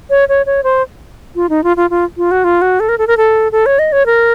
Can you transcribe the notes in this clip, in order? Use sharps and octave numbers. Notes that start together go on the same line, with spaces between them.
C#5
C#5
C#5
C5
F4
D#4
F4
F4
F4
F4
F#4
F4
F#4
A4
A#4
A4
A#4
A4
A4
C#5
D#5
C#5
A#4